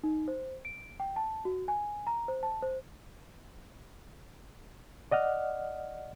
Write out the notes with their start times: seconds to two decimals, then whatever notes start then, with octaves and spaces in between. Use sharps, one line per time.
0.03 D#4
0.28 C5
0.65 D7
1.00 G5
1.16 A5
1.45 F#4
1.68 G#5
2.07 A#5
2.28 C5
2.43 A5
2.62 C5
5.11 D5 D#5 F#5 F6